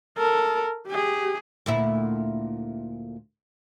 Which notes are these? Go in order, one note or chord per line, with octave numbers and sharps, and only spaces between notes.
A4 A#4
G4 G#4
D2 A#2 E4